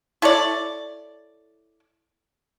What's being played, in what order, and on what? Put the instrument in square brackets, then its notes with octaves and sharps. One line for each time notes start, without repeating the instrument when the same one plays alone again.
[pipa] E4 A4 C#5 D5